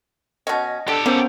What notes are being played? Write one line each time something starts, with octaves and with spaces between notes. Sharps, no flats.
B2 C#4 D#5
D3 G4 A4
A#3 B3 C#4 C5